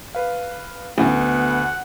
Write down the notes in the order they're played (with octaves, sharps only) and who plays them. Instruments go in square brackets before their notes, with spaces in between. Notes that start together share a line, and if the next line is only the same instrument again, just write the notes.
[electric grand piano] B4 F5
[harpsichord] A1 [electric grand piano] D2 [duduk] B3 [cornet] F#5